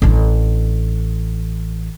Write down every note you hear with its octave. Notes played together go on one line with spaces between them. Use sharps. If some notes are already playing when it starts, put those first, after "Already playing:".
A1 D4